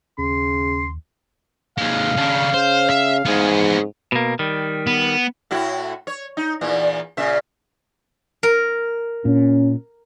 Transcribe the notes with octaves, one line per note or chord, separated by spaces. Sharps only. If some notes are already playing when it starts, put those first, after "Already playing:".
D#2 C#3 C6
D#2 G#3 F5
C#3 D4
C#3 C5
E5
G#2 B3 G#4
B2 A#3
D#3 G3
B3
A2 E4 F#4
C#5
D#4
E2 A#2 E3
A#2 C#3 E5
A#4
A#2 C#4